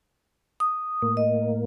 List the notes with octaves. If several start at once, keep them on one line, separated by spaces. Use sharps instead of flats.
D#6
A2 A#3
D#5